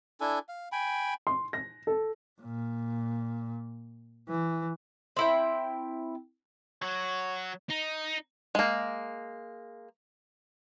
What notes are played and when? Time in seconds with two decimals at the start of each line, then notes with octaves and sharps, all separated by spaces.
0.21 D4 E4 A4 G#5
0.49 F5
0.72 G5 G#5 B5
1.27 C6
1.53 A#6
1.87 A4
2.42 A#2
4.29 E3
5.17 C4 E4 G5
6.82 F#3 F#4 C#5
7.69 D#4
8.55 G#3 A#3